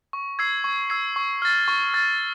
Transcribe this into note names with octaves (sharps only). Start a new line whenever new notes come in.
C#6
E6 G#6 C7
C#6
E6 G#6 C7
C#6
F6 A6
C#6
F6 A6